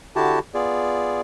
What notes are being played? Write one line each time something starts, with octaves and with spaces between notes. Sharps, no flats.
D3 E4 F#4 G4 A5
B3 F4 G#4 D5